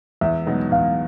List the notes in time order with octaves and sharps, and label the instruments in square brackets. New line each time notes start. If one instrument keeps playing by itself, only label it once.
[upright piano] E2 [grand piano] E5
[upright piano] B2 F#3 B3 D#4
[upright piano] E2 [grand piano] F5